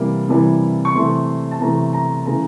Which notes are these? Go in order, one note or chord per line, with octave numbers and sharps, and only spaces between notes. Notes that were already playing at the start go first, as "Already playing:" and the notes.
Already playing: C3 E3 G3 A#3
C3 E3 G3 A#3
C#6
C3 E3 A3 C6
A5
C3 E3 A3 A#5
A#5
C#3 E3 A3 A#5